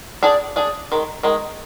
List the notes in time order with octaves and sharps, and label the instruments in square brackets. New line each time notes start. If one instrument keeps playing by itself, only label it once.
[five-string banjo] D4 G#4 D5
D4 G#4 D5
D#3 G#3
D#3 G#3